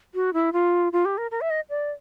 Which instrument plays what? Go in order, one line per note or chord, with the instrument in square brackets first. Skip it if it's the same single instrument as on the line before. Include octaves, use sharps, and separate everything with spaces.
[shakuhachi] F#4
E4
F4
F4
G4
A#4
A#4
E5
D#5
D5